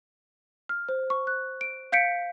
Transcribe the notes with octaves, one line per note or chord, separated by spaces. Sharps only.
F6
C5
C#6
F#6
D7
F5 G6 B6 C#7 D7